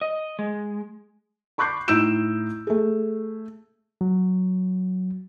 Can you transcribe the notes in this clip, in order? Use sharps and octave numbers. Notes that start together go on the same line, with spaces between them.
D#5
G#3
B5 C#6 D6 F#6 G6 C7
A2 D#4 E6 G6 D7 E7
A3 G#4
F#3